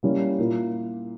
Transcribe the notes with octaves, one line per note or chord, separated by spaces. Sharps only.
G3 A#3 C#4 E4
A#2 A#3 E4